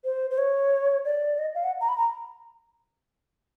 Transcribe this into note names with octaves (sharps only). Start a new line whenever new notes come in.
C5
C5
C#5
D5
D#5
F5
F#5
A#5
B5
A#5